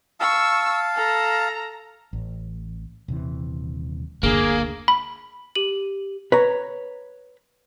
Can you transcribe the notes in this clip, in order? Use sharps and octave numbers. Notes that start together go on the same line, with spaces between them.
F5 A5 C#6 E6
A4 A#5
A1
D#1 C3 E3
F#1 D2 D3 A#3 D4 G#4
B5
G4 D#7 F#7
B4 C#5 A#5